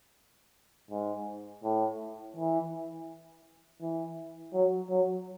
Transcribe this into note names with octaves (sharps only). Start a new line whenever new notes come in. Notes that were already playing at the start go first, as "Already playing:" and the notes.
G#2
A2
E3
E3
F#3
F#3